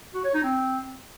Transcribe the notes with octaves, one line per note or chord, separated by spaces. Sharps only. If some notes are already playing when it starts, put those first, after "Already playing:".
F#4
C#5
D#4
C4